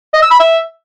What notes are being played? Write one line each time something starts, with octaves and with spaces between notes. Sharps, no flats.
D#5
E6
B5
E5